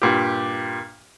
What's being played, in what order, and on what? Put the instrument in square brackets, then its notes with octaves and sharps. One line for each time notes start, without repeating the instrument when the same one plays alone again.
[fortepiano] G2 A#2 G4